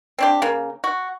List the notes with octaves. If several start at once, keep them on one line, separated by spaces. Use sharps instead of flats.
C4 D4 G4
C#3 A#3
F#4